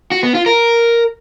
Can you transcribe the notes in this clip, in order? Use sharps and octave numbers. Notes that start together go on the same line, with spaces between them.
F#4
B3
F4
A#4